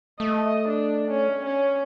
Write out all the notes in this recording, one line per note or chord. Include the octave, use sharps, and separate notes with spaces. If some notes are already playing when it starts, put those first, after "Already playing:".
A3 D#5
D4
C#4
C#4